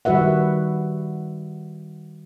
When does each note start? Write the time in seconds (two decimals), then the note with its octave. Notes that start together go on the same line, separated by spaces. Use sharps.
0.05 D#3 G3 F#4 B4 E5 F#5